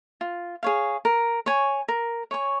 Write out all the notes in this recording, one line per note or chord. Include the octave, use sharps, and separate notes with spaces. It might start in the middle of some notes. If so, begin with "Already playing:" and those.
F4
G#4 C#5 F5
A#4
C#5 G#5 C#6
A#4
C#5 G#5 C#6